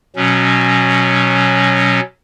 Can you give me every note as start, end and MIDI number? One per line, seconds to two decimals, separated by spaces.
0.16 2.00 47
0.16 2.00 54
0.16 2.00 61